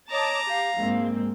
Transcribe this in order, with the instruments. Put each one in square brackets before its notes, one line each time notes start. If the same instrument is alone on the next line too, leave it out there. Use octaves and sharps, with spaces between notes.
[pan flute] C#5 [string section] D#5 A5 D6 [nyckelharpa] A#5
[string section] G4 [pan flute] F5
[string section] A#1 G#2 C4 [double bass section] G#3 A#3